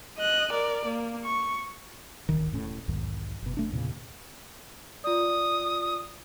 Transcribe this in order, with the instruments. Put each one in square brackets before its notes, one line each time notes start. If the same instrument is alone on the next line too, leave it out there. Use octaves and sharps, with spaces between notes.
[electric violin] D#5 F#6
A#4 D5
A#3
C#6
[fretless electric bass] D1 G#1 D#2 D#3
E1 A2 C#4
B1 E2 G#2 D#3
F#1 B2
F1 A3 D4
E2 A#2 C#3
[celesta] F4 D5 [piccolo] D#6